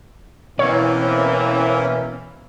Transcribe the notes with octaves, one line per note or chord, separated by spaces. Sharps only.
B2 E3 A#3 C4 C#4 C#5